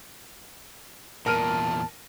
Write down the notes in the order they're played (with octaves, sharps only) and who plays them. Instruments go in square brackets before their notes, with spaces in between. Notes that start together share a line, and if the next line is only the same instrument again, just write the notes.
[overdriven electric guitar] E2 A#2 [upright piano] A#4 F6 D#7 [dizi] A5